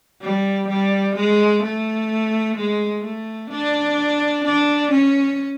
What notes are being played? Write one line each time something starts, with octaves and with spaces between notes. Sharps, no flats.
G3
G3
G#3
A3
G#3
A3
D4
D4
C#4